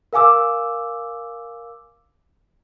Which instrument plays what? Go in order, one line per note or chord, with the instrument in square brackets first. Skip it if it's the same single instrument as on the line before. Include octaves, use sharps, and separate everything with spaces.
[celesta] A#4 F5 G#5 D6 E6